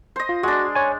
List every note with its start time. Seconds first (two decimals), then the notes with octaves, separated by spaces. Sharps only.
0.16 C5 D#5
0.29 F4
0.43 G#3 D4 F#4
0.75 C#5 G#5